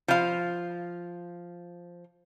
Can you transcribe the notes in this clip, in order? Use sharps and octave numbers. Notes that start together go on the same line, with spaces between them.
F3 F5